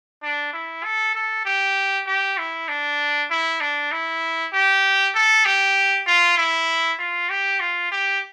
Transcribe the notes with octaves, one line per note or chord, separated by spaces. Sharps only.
D4
E4
A4
A4
G4
G4
E4
D4
E4
D4
E4
G4
A4
G4
F4
E4
F4
G4
F4
G4